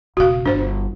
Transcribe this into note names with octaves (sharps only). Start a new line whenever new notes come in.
E1 C#3 F#4 F5
G1 E3 D4 C5